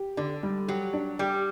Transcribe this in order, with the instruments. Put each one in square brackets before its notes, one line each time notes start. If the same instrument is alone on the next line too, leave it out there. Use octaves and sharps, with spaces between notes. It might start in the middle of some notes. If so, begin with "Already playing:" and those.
Already playing: [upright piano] G4
[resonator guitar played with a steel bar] D3 [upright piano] D4
[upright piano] G3
[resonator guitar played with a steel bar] F#3 [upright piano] G4
[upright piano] D4
[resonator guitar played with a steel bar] G3 [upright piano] G4